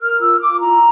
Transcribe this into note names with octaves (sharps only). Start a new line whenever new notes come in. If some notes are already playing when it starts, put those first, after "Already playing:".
A#4 F6
F4 E6
F4 D6
E4 A#5